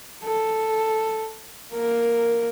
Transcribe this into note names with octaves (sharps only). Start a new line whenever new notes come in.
A4
A#3 A#4